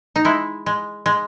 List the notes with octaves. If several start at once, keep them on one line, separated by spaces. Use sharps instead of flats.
D#4
G#3 E4
G#3
G#3